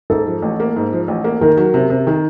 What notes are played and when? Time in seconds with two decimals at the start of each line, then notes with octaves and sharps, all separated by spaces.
0.10 G#2 A4
0.27 F3
0.42 A1
0.60 A#3
0.76 G#2
0.93 F3
1.08 A1
1.24 A#3
1.41 D#3 A#4
1.57 F#3
1.74 C3
1.90 C3
2.07 D#3